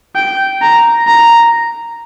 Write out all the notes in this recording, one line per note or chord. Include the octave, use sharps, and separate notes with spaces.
G5
A#5
A#5